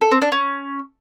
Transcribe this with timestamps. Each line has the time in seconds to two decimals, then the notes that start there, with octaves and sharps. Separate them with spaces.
0.01 A4
0.11 C4
0.22 D4
0.32 C#4